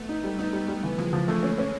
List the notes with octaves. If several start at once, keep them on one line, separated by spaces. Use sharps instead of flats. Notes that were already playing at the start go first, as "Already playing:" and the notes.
Already playing: A3 B3
D#4
G3
A3 B3 D#4
G3
G3
E3
F3 G#3 A#3
F3
D3 E3 A3
C#4
C#4